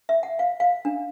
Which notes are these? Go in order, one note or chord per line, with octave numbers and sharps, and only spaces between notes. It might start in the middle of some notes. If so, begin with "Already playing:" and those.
E5
F#5
F5
F5
D4